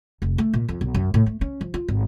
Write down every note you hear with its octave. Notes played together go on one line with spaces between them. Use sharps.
F1
A3
A#2
F2
B1
F#2
A2
A3
C#4
F3
F4
G#1